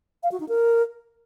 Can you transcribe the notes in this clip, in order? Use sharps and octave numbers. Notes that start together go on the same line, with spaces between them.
F5
F#4
D#4
A#4